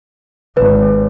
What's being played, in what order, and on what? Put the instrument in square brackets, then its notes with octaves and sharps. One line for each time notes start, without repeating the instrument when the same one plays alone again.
[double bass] G#1 [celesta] B4